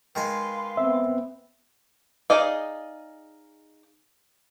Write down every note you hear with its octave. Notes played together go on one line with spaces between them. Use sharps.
D#3 G#3 B4 F5 G#5 C6
B3 C4 E5
D#4 G#4 D5 D#5 F5